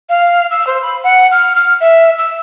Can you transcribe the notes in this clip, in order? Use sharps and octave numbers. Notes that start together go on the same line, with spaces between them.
F5
E6
C5
B5
F#5
F6
F6
E5
E6